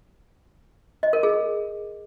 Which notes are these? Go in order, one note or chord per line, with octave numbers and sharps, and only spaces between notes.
D#5
A#4
G#4